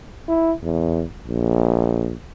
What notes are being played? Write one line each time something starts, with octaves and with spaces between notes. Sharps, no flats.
E4
E2
A#1